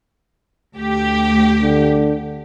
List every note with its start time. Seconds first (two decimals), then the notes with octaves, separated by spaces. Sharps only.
0.78 D2 G4
1.63 D3